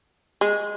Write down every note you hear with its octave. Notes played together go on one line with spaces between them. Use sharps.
G#3